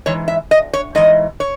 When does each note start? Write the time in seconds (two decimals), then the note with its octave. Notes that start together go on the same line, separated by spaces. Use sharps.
0.06 G#2 E3 C#5
0.28 E5
0.51 D#5
0.73 C#5
0.95 G#2 E3 D#5
1.40 C#5